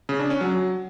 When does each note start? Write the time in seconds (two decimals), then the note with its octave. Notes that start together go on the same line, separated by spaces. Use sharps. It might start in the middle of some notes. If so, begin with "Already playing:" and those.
0.09 C#3
0.20 D4
0.30 C#4
0.41 F#3